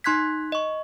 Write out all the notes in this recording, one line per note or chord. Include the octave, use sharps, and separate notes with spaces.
D#4 C6 F#6 G#6 B6
D#5 C#6